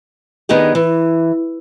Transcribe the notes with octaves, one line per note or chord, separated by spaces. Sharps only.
D#3 B3 D4 D#4 G4 G#4
E3